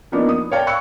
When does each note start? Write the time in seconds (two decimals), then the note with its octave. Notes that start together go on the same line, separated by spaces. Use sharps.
0.12 F3 A#3 B3 D4 D#4
0.29 D#6
0.52 C#5 D5 F5 G5 A5
0.67 B5 C#6 E6 F#6 C#7